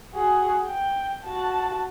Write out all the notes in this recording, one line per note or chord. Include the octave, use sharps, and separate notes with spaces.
F#4 G#4
G5
F#4 A5